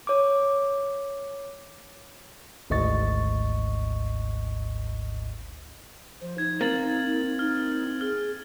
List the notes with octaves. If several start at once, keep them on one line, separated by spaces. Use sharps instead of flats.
C#5 D6
G#1 D2 G#2 D#5 C#6 A6
F3 C5
D#4 G#6
A#3 C4 G#6 A6 F#7
D#4 F6
G#4 F6